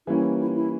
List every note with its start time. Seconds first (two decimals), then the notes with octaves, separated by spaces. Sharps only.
0.07 E3 G3 A#3 C#4 E4
0.40 E4
0.55 E4